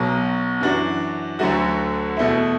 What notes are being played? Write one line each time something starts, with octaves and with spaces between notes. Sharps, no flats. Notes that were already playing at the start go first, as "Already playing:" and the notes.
Already playing: B1 B2 F#3
F#2 E3 D4 F#4
D2 D3 F#3 A3 F#4
E2 B2 A3 E4